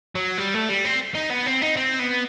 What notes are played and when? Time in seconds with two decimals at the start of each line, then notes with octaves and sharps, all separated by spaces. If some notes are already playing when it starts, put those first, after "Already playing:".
0.15 F#3
0.38 G3
0.54 A3
0.69 G3
0.84 C4
1.15 D#4
1.30 B3
1.46 C4
1.61 D#4
1.77 C4
1.99 B3